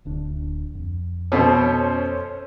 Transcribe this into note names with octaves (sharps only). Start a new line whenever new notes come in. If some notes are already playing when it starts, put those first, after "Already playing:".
D1 D2 D4
F2
B2 C#4 A4 C5